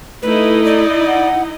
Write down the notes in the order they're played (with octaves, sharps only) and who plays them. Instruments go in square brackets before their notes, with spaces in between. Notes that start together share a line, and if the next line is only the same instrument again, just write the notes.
[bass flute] A3 [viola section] D#4 E4 D#5 [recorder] B4
[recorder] D5
[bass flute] F#5